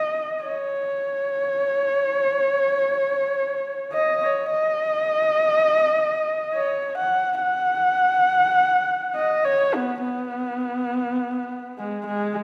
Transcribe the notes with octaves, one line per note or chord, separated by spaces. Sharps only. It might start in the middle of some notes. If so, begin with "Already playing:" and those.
Already playing: D#5
C#5
D#5
C#5
D#5
C#5
F#5
F#5
D#5
C#5
B3
B3
G#3
G#3